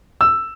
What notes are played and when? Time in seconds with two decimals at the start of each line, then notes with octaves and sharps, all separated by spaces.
0.21 E6